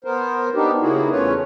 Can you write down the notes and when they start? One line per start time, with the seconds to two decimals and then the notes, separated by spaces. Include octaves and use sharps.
0.04 B3 A#4 C5
0.55 B3 D4 D#4 G4
0.81 C#3 A#3 B3 E4 F#4 G#4
1.11 E2 A3 C#4 F4 B4 C#5